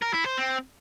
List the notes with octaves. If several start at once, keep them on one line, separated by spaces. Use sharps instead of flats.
A#4
E4
C5
C4